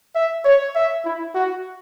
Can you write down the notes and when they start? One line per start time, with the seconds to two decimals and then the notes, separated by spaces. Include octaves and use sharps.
0.15 E5
0.45 C#5
0.75 E5
1.05 E4
1.35 F#4